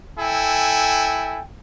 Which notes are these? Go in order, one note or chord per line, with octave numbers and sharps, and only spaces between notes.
E4 A4 G5 G#5